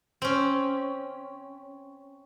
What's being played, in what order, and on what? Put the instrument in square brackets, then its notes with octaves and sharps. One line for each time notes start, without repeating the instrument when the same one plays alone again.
[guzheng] C4 C#4